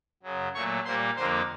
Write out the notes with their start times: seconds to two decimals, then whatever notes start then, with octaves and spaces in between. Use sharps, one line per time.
0.23 F#2 C#3 F#3
0.54 A#2 F#3 A3 C#5 C#6
0.85 A#2 G3 A#3 C5 C6
1.16 F2 D3 F3 A#3 C5 C6